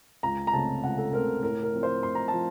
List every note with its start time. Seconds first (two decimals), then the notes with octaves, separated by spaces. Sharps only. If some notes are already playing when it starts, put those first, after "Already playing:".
0.23 C#2 A#5
0.47 A#5
0.53 C#3 A3 C4 A5
0.83 C#2 F#5
0.98 A4
1.13 C#3 A3 C4 A#4
1.43 A2 A#4
1.63 A#4
1.73 F3 C4
1.83 C5
2.03 A2 C6
2.15 A#5
2.28 A5
2.33 F3